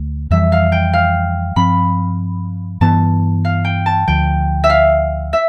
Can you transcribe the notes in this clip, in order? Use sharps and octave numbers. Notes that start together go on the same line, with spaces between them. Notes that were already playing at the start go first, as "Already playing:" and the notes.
Already playing: D2 A3
F2 E3 G3 E5
F5
G5
F5
G2 F3 C4 B5
G2 E3 B3 A5
F5
G5
A5
D2 D3 F3 G5
E5
F5
E5